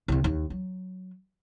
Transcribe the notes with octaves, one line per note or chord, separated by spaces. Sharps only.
C2 C3
D#2
F#3